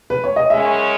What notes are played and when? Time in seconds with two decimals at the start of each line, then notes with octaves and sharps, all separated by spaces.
0.10 B4
0.24 C#5
0.36 D#5
0.50 F#2 C#3 G#3 C#4 E5